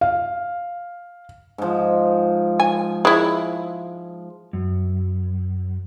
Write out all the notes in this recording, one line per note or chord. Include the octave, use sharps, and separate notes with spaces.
F5
G#2 F3
G#5
G#3 E4
F#2